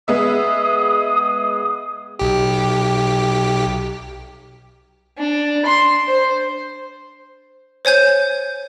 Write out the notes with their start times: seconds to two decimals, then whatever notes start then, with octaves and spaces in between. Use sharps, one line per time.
0.08 G#3 B3 E5 D#6
2.19 B1 G4
5.18 D4
5.66 C6
6.06 C5
7.85 C5 C#5 G#5 G6